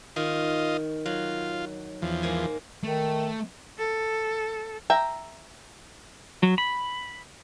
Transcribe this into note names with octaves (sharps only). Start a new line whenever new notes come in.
D#3 F4 D#5
F#3 F4
E2 F3
G#2 A#3 G#5
D#3 A3
A4
E5 G5 A#5
F#3
B5